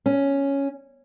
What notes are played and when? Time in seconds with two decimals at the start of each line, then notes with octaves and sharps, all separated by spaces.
0.06 C#4